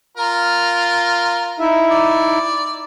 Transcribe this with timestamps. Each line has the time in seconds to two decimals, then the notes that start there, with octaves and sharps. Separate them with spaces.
0.17 F4 A#4
1.59 D#4 E4 E5
1.90 D5